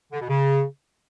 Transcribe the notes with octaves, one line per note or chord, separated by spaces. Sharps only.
D3
B2
C#3